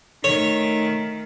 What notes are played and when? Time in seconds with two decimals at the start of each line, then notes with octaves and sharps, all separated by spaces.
0.24 D#3 A3 C#5